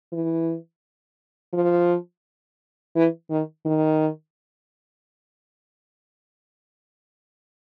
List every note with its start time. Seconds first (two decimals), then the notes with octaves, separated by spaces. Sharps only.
0.12 E3
1.53 F3
2.96 E3
3.30 D#3
3.66 D#3